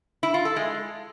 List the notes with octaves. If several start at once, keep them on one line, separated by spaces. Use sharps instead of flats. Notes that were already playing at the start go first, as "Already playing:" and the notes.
E4
F4
A4
G#3